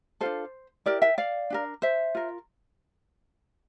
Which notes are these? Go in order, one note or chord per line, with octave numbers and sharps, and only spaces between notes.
D4 F4 A4 C5
E4 G4 A#4 D5
E5 G5
D5 F5
D4 G4 A#4
C5 E5
F4 A#4